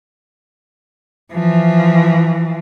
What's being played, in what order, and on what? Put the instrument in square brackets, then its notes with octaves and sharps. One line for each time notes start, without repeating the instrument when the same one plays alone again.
[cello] E3 F3